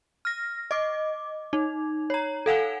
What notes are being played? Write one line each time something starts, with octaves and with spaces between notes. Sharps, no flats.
F6 A#6
D#5 D6
D#4
C#5 A#5
A4 F5 F#5 G#5